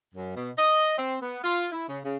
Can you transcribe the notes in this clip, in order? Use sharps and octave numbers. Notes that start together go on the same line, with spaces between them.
F#2
B2
D#5
C4
B3
F4
E4
C#3
C#3